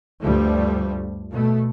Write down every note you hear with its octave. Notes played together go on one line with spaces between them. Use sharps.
D2 G2 F3 G3 A3
B2 A3